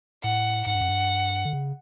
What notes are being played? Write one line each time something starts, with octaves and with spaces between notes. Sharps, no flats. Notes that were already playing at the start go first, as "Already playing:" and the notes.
A2 F#5
G#2 F#5
G2
F#2
G2
D3
C#3